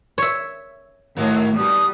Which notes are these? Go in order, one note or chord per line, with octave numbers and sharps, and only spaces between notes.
C#5 E5
D#2 A2 F#3 A#3
B2 G3 D#4 D#6